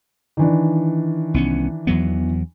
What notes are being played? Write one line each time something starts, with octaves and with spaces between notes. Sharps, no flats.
D#3 E3 D4
C2 B3 C#4
E2 F#3 B3